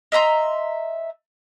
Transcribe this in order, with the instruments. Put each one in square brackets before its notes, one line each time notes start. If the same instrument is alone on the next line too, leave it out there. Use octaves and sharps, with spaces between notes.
[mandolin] D#5 E5 A#5 C6